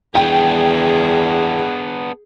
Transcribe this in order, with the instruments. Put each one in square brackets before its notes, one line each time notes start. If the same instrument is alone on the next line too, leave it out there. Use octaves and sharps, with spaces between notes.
[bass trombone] E2 [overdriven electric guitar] B3 D4 [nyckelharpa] G#4 [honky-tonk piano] G5